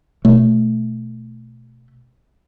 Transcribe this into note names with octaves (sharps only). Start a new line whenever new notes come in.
B2 A3